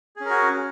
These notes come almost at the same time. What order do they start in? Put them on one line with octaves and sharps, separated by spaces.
G#4 C#4 A#4 F#4